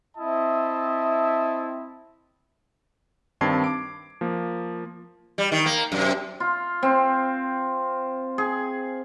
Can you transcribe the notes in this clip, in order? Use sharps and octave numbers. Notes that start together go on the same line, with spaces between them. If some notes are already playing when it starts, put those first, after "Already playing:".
C4 E4 D#5 E5 A5
G2 D#3 C4 A5 G#6 C7
D6 D7
F3 A#3
G3
D#3
A#3
F#2 C3
F4
C4
G#4